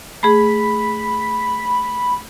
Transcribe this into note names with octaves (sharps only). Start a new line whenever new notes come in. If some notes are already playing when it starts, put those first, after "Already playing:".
A3 G#4 B5